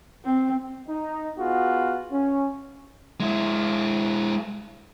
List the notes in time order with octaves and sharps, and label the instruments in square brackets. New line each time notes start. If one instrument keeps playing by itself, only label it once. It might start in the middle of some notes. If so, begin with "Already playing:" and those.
[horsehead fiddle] C4
[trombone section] D#4
B3 F4 F#4 G#4
C#4
[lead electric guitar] G#3 E4